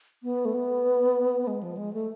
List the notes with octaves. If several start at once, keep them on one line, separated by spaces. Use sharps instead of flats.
B3
A3
B3
G#3
F3
G#3
A3